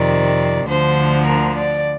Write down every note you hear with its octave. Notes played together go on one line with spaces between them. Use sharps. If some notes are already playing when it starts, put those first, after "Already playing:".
Already playing: F2 C3 D#3 D5
D2 D3 F3 C5
A#4
D5